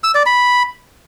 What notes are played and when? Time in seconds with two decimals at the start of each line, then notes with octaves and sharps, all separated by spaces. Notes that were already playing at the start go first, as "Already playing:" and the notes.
0.04 E6
0.15 D5
0.26 B5